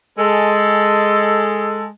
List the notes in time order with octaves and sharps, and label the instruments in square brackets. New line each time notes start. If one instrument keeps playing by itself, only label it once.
[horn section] G#3 A4